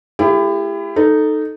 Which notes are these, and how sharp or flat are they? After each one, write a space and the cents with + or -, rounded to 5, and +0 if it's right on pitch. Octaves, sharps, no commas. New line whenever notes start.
A3 +0 E4 +30 G4 +30
D#4 -10 A4 +0